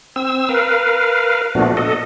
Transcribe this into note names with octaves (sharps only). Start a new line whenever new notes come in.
C4 E6
A#4 B4 F5
A#2 F3 A3 B3 D4 F#4
A4 D#5